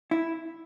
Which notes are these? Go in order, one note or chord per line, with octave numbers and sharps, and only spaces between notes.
E4